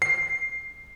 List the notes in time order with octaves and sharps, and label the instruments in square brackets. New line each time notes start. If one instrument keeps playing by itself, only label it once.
[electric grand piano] C7